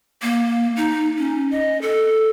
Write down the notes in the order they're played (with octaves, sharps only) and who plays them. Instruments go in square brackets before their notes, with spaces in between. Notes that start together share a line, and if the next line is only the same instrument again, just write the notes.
[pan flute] A#3
D#4
C#4
D#5
A4